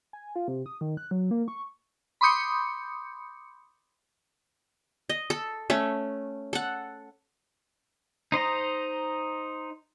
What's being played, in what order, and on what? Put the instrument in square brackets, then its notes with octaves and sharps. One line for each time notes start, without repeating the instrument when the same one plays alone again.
[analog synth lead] G#5
F4
C3
D#6
D#3
F#6
F#3
A#3
C#6
[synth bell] B5 C6 D6 D#6 G6 C#7
[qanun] D#5
A4
A3 C#4
A4 F#5
[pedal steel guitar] D#4 C5 D#5 A#5